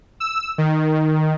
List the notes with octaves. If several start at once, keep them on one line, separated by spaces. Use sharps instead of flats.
E6
D#3